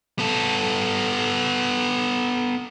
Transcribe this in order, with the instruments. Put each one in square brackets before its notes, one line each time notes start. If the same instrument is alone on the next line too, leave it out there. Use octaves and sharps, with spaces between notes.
[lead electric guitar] B3 A4